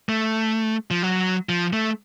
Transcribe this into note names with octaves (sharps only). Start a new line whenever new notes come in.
A3
F3
F#3
F3
A3